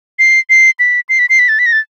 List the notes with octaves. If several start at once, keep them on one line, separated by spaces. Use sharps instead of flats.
C7
C7
B6
C7
B6
C7
B6
A6
B6
A#6
A6